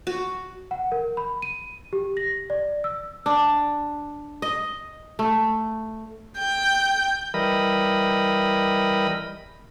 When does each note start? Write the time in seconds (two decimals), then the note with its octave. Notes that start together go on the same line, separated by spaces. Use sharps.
0.07 F#4
0.71 F#5
0.92 A#4
1.17 B5
1.42 D#7
1.93 G4
2.17 A#6
2.50 D5
2.84 E6
3.26 D4
4.42 D#5
5.19 A3
6.37 G5
7.34 E3 G3 A#4 D#5 B5